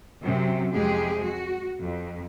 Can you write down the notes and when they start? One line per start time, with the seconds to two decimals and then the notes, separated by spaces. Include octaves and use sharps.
0.22 F#2 C3 F#3
0.72 F2 C3 G#3 G4 G#4
1.23 F#4
1.82 F2